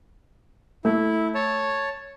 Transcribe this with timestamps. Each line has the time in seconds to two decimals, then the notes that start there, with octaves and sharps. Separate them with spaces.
0.85 A3 E4
1.35 C#5 A5